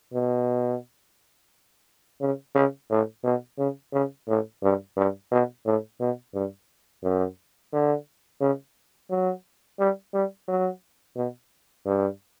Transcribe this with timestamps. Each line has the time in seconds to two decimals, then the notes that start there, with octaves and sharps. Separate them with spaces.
0.14 B2
2.21 C#3
2.55 C#3
2.91 A2
3.24 B2
3.58 C#3
3.93 C#3
4.28 A2
4.63 G2
4.97 G2
5.32 B2
5.66 A2
6.00 B2
6.34 G2
7.03 F#2
7.73 D3
8.41 C#3
9.10 F#3
9.79 G3
10.14 G3
10.48 F#3
11.16 B2
11.86 G2